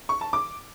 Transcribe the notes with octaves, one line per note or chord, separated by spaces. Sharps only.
C#6
A5
D6